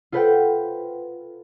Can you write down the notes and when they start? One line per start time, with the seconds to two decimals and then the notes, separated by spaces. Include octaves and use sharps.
0.12 F4 A4 B4 C5 F#5 G5